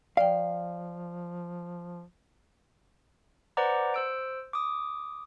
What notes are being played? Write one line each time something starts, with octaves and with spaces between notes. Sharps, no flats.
F3 D5 F5 G5
B4 C5 D5 F#5 A#5 D6
C5 E6 D7
D6 D#6